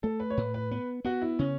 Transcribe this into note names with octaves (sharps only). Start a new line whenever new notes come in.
A3 A4
B4
C#5
A2 B4
B4
B3 B4
B3 F#4
E4
C#3 C#4